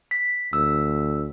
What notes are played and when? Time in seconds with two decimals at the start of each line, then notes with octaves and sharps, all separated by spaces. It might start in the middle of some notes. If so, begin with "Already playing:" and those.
0.11 B6
0.53 D2 E6